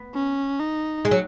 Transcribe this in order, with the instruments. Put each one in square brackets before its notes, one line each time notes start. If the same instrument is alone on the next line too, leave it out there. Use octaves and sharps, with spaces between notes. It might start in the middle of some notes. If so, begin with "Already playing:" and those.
Already playing: [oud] B3
[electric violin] C#4
D#4
[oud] G#3
F#3